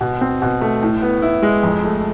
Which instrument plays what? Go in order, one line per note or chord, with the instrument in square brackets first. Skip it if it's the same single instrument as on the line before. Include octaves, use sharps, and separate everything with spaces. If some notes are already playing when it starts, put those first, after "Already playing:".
[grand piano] B2
C4
B2
A3
A2
B3
E4
G#3
F2
A3